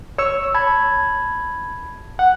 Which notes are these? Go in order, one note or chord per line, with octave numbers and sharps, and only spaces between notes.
C#5 C#6 E6
A5 B5 G#6
F#5